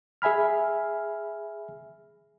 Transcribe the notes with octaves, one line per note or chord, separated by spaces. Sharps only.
G#4 E5 G#5 B5 F6